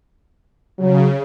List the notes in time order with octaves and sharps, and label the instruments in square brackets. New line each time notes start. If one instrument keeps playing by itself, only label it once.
[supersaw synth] C#3 [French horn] F#3